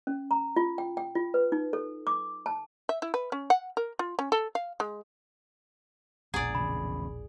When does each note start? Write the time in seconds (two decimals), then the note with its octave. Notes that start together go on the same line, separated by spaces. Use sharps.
0.07 C#4
0.31 A#5
0.56 F4
0.78 G5
0.97 G5
1.15 F4
1.34 B4
1.52 D#4
1.73 A4
2.07 D6
2.46 A5
2.89 E5
3.02 E4
3.14 B4
3.32 C#4
3.50 F#5
3.77 A#4
3.99 F4
4.19 C#4
4.32 A4
4.55 F5
4.80 G#3
6.34 E1 A#1 G#4 D5 F#5 A#5
6.55 E2 C#3 B5